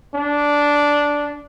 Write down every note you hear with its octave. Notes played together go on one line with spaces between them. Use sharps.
D4